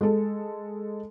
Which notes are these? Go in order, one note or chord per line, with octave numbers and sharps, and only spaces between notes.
G#3 A4